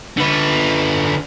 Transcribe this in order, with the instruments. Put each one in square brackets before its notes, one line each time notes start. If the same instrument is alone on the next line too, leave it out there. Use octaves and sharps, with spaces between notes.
[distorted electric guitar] D3 B4